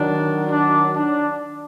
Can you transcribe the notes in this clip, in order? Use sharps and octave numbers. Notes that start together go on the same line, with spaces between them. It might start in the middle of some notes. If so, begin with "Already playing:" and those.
Already playing: D#3 F#3 D4
D4
D4